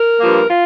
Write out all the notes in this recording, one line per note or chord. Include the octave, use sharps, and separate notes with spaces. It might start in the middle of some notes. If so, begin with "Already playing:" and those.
Already playing: A#4
G2 F3 A#3
F4